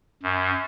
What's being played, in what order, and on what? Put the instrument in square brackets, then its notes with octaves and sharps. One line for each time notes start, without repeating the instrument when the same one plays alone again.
[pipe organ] F#2